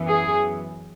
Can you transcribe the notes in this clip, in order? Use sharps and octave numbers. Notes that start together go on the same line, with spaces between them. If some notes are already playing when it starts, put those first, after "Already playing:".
Already playing: F#2 E3 B3
G#4